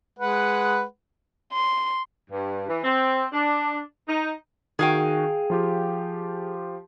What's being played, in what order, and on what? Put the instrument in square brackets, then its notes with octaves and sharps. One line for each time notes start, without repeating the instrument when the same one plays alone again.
[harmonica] G#3 B4 F#5
[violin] C6
[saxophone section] G2
E3
C4
D4
D#4
[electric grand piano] D#3 F#4 D#7 [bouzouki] G#4 F5 G5
[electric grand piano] F3 F4 G4